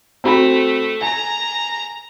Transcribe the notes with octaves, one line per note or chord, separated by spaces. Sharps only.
A3 C4 F#4 B5
G#5 A#5